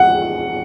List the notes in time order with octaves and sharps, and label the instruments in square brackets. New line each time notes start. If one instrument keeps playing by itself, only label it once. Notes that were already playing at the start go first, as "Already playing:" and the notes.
Already playing: [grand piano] F#5